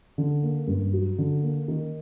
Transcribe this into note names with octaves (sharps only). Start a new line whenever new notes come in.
D3
A#3
G2
F#3
D3
A#3
D#3